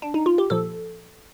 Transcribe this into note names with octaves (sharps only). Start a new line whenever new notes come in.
D4
D#4
F4
G4
A#2 F3 A4